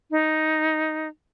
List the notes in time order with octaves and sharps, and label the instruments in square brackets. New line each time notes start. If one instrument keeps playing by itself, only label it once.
[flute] D#4